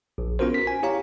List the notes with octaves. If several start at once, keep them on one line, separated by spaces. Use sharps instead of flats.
A#1
B3 C#4 F4 F#4 A#4 C5
B6
G#5
E4 G4 C#5 F5 A#5